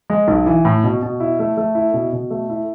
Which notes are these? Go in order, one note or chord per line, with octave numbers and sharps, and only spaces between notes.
G#3
B1
E3
A2
B2
B2
E4
A3
A3
E4
B2
B2
A3
E4